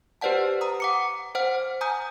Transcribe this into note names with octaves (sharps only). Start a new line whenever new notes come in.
G4 B4 C5 D5 F#5 A5
A#5 D#6
F#5 D6 C#7
C5 F#5 F6
G#5 A#5 D#6 G6